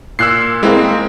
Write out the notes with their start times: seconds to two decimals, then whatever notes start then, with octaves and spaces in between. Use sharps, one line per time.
0.19 A#2 E6 F#6 C7
0.63 G#3 A#3 C4 E4